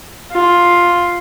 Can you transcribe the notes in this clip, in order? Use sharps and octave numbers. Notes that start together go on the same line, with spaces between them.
F4